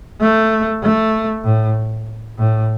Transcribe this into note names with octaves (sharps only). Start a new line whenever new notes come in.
A3
A3
A2
A2